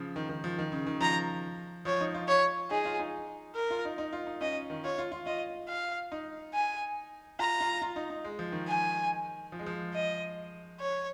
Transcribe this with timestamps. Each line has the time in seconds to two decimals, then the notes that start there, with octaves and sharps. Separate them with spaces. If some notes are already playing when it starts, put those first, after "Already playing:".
Already playing: C#3 F3
0.16 D#3
0.29 D#3
0.44 F3
0.58 D#3
0.72 C#3
0.87 D#3
1.01 F3 A#5
1.85 F3 C#5
2.01 D#4
2.14 F4
2.28 C#5
2.70 D#4 G#4
2.85 F4
2.99 D#4
3.56 A#4
3.70 F4
3.85 D#4
3.98 D#4
4.13 F4
4.27 D#4
4.41 C#4 D#5
4.70 D#3
4.84 F4 C#5
4.98 F4
5.12 F4
5.26 F4 D#5
5.68 F5
6.12 D#4
6.54 G#5
7.39 F4 A#5
7.61 F4
7.82 F4
7.96 D#4
8.10 D#4
8.24 G#3
8.39 F3
8.52 D#3
8.68 G#5
9.52 F3
9.59 G#3
9.66 F3
9.94 D#5
10.80 C#5